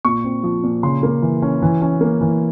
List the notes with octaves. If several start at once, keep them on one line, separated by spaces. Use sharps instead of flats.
A#2 C#6
C4
F3
A#2
C#3 C6
A#3
E3
C#4
E3
C#4
A#3
E3